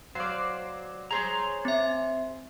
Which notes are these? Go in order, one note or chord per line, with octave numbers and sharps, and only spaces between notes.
F#3 C5 D5 F5
G#4 C5 C#5 A#5
C4 E5